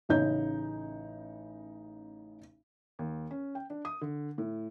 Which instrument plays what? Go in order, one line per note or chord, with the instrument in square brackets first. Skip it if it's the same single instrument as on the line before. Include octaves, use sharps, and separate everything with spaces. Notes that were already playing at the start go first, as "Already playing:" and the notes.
[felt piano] A1 C#3 D#4 G6
D#2
C#4
G5
D4
D#6
D3
A2